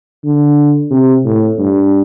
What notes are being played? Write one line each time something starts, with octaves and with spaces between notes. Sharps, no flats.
D3
C3
A2
G2